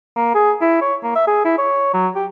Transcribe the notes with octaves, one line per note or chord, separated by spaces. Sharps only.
A#3
G#4
E4
C#5
A#3
E5
G#4
E4
C#5
F#3
G4